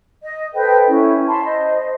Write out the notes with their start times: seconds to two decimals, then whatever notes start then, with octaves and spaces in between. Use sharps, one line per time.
0.23 D#5
0.54 A4 B4 C5 G5
0.88 C#4 E4
1.27 A5 B5 C6
1.44 C5 D#5